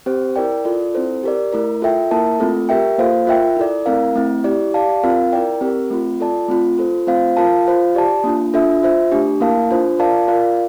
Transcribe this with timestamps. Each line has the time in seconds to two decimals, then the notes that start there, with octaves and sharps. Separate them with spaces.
0.06 C4 G4 C5
0.36 E4 A#4 D5 G5
0.65 F4 A4 D5
0.94 C4 E4 A4 C5
1.23 G4 A#4 D5
1.53 A3 E4 A#4
1.82 F4 A4 E5 G5
2.11 A#3 E4 A#4 E5 A5
2.40 A3 C4 F4 A4
2.69 G4 A#4 E5 G5
2.98 A#3 F4 A4 C5 F5
3.27 F4 A#4 E5 G5
3.57 E4 A4 D5
3.86 A3 C4 E4 A#4 F5
4.15 A3 C4 E4
4.44 E4 G4 D5
4.74 G4 D5 F5 A5
5.03 C4 F4 A#4 F5
5.33 E4 A#4 D5 G5
5.61 C4 G4 A#4
5.91 A3 C4 F4
6.20 F4 A4 D5 A5
6.48 A3 C4 F4
6.78 F4 A4 C5
7.07 A3 C4 F4 C5 F5
7.37 F4 A#4 F5 A5
7.66 F4 C5 F5
7.95 G4 D5 A5
8.24 A#3 D4 F4
8.54 D4 F4 A4 E5
8.83 F4 C5 E5
9.12 A3 D4 G4
9.40 A#3 E4 A#4 F5 A5
9.70 D4 F4 C5
9.99 F4 A#4 D5 F5 A5
10.28 F4 A#4 D5 F5